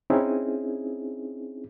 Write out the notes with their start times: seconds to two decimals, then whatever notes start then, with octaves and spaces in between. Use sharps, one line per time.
0.10 C4 C#4 D#4 E4 G#4